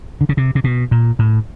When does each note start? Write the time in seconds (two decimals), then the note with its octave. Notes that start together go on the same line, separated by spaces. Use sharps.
0.21 D3
0.29 C#3
0.37 C3
0.55 C3
0.64 B2
0.91 A#2
1.19 A2